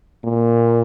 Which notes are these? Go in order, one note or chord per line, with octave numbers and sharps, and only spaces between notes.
A#2